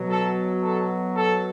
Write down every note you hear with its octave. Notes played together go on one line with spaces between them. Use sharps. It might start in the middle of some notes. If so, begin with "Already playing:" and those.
Already playing: B2 F#3
A4
A4
A4